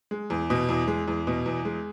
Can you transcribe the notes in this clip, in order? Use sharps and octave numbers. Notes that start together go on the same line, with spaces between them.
G#3
E2
B2
E2
G#3
E2
B2
E2
G#3